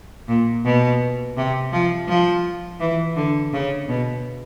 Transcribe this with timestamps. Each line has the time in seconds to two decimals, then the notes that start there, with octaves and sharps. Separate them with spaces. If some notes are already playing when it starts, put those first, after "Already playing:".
0.28 A#2
0.65 B2
1.37 C3
1.72 F3
2.08 F3
2.80 E3
3.16 D3
3.53 C#3
3.88 B2